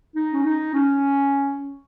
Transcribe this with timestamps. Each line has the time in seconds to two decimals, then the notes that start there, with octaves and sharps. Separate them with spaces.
0.15 D#4
0.33 C#4
0.45 D#4
0.74 C#4